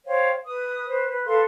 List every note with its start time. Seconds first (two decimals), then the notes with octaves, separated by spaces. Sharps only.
0.06 C5 C#5 F5 G5
0.45 B4 D#6
0.87 B4 C5
1.07 B4
1.26 A4 B4 F5 C6